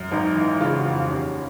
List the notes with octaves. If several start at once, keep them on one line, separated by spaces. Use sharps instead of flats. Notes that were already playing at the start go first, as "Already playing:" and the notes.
Already playing: F#2
G#1 D#4
E3
C#3 F4
F#4
F2
F4
D#2 C#4